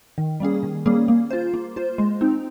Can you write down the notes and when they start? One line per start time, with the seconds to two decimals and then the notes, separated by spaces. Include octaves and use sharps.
0.18 D#3
0.40 G3 A#3 C#4 G#4
0.63 D#3
0.86 G3 A#3 C#4 G#4
1.08 A#3
1.31 F4 C5
1.54 A#3
1.76 F4 C5
1.98 G#3
2.21 C4 D#4